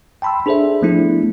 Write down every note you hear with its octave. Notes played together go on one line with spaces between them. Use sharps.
G5 A5 B5 C6 E6
D4 G#4 A4 C5 D5 E5
F3 A3 B3 D4 E4